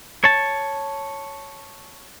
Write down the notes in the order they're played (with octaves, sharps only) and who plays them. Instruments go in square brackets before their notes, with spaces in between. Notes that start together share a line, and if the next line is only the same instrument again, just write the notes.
[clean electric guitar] C#5 A5